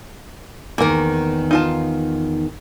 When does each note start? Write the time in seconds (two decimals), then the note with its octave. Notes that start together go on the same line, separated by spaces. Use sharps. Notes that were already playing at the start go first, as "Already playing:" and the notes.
0.78 E2 D#3 A#3 A#4
1.51 D#4 F4 A5